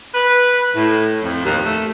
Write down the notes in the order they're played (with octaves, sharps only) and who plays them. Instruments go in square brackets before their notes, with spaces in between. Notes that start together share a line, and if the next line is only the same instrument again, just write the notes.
[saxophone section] B4
A2
F2
D#2
A3